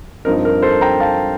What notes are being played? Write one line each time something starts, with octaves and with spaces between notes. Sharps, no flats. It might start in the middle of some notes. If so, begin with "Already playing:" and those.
G2 F3 C4 D#4 A#4
A#4
A4 C5
G5 A#5
F5 A5